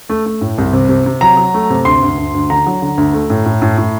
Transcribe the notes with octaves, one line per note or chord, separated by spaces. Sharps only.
A3
A3
A2
C2
C3
C3
C3
F#3 A#5
F#3
A3
C3
D2 C6
D2
D2
D2
D3 A#5
F#3
D3
D2
A3
A2
A2
A2
A2